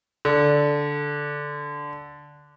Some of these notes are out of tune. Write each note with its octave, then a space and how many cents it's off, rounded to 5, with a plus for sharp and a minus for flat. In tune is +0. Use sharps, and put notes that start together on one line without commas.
D3 -5